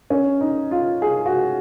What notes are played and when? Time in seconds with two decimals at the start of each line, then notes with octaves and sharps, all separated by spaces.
0.10 C#4
0.41 D#4
0.71 F4
1.02 G#4
1.26 F#4